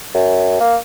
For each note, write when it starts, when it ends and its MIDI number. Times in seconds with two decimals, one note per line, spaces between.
0.14 0.59 42
0.60 0.76 58